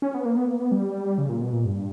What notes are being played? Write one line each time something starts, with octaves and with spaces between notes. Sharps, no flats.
C#4
B3
A#3
B3
A#3
B3
G3
C#3
A#2
B2
A#2
G2